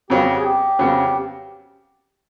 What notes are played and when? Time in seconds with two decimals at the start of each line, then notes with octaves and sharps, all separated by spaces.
0.10 F2 C#3 F#3 B3 G4
0.38 G#4
0.44 G4
0.79 F2 C#3 F#3 B3